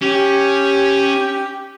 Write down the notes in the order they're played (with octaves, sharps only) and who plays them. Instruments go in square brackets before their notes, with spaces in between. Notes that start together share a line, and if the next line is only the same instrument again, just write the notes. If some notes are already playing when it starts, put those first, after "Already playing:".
[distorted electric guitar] C#4 [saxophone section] G4